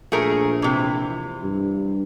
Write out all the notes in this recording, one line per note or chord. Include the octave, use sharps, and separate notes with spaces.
A#1 A3 G#4 A#4
C3 E3
G2